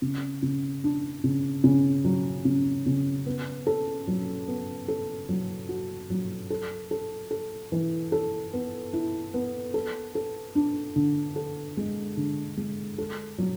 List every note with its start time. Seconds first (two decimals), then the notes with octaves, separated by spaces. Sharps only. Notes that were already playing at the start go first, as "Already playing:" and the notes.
0.02 C#3
0.43 C#3
0.84 D4
1.24 C#3
1.64 C#3
2.05 F#3
2.45 C#3
2.86 C#3
3.26 B3
3.67 A4
4.07 F#3
4.48 B3
4.88 A4
5.29 F#3
5.69 F#4
6.10 F#3
6.50 A4
6.91 A4
7.31 A4
7.72 E3
8.12 A4
8.53 B3
8.93 E4
9.34 B3
9.74 A4
10.15 A4
10.55 D4
10.96 D3
11.36 A4
11.77 G#3
12.17 D3
12.57 G#3
12.98 A4
13.38 F#3